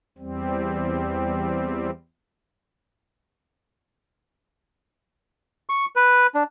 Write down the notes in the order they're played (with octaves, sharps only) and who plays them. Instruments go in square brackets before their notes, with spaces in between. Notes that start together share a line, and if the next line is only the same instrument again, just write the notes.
[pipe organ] E2 G3 C4
[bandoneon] C#6
B4
D4